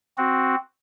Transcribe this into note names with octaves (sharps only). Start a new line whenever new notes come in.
C4 F#4